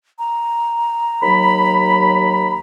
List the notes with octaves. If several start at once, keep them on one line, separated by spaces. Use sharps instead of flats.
A#5
D#2 F#3 B5